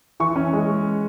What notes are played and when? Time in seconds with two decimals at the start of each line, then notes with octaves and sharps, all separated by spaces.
0.20 E3 C#6
0.36 C#4
0.53 G#3